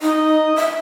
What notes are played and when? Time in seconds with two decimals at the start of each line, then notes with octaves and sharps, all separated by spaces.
0.02 D#4 D#5
0.56 E5